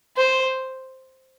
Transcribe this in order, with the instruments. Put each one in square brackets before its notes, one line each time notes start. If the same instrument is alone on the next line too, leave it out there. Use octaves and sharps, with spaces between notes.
[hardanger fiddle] C5